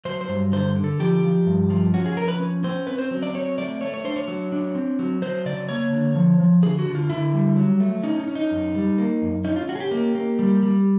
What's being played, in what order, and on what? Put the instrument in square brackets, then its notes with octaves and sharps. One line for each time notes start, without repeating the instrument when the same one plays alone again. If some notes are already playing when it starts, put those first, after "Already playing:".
[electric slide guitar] F#3 C5
C5
G2
D3 C5
D3
A4
F3 G4
F3
G2
F3
C#4 F#4
G#4
F3 A#4
B4
C#4
C#4 C5
C4 B4
C5
F#3
D5
C4 C#5
A3 D5
A3 C#5
C#5
D4 C5
C#5
F#3
D4
C4
F#3
F#3 C5
C#3 D5
A#3 C#5
D3
F3
F3
D3 G#4
F#4
D3
F4
D3 E4
G3
F#3
A3
C#4 D#4
D#4
C#4
D#4
F#2
G3
A#3
F#2
C#4 D#4
F4
C#4 F#4
G#4
G4
A#3
A#3
G3
G3